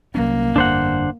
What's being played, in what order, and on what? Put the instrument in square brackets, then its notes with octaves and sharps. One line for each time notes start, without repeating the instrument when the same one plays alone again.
[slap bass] C2 F#3 C#4 [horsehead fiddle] A#3
[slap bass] G1 F2 [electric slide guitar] D4 C5 F#5